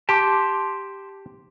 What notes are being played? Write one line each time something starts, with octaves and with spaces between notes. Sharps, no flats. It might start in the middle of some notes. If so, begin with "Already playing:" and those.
G4 A5 C6 D6